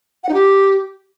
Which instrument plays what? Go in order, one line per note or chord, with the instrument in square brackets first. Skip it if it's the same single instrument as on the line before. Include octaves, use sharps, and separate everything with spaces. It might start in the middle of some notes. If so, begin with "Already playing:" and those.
[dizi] F#5
D#4
G4